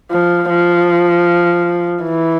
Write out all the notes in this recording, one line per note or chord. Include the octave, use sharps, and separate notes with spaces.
F3
F3
E3